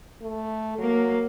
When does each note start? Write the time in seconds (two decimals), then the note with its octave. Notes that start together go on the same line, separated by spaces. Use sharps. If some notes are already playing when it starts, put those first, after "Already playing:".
0.22 A3
0.79 F#3 A#3